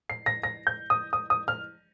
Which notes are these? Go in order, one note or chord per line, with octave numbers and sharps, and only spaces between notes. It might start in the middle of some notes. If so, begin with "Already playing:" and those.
C7
A#6
A#6
G6
D#6
D#6
D#6
F6